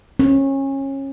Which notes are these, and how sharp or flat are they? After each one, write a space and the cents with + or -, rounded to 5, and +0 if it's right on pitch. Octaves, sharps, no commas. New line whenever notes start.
C#4 -25